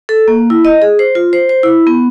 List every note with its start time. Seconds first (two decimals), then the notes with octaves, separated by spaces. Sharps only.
0.09 A4
0.28 A#3
0.50 E4
0.65 D#5
0.82 G#4
0.99 C5
1.15 F4
1.33 C5
1.49 C5
1.63 E4
1.87 B3